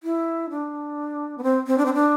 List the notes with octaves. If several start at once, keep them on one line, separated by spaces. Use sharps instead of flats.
E4
D4
B3
C4
C4
D4
C4
D4